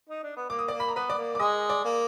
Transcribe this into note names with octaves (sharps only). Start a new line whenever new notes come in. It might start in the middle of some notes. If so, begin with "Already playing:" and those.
D#4
D4
B3
A#3 D6
D#6
A#3 D5 D6
B5
A#5
B3 B4 B5
D5 D6
A#3
D6
G#3 D#5 D#6
D5 D6
A#3